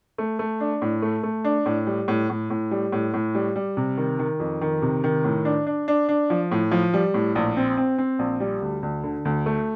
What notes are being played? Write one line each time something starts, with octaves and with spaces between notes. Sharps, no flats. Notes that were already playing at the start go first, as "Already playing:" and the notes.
A3
A3
D4
A2
A3
A3
D4
A2
G3
A2
A2
A2
G3
A2
A2
G3
G3
C3
D#3
D#3
F2
D#3
C3
D#3
A2
D4
D4
D4
D4
F3
A2
F3
G3
A2
A#1
C4
C4
C4
A#1
G3
D2
D2
D3
D2
A3